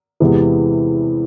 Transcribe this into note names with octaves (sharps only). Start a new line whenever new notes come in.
E2 C3 E3 G#3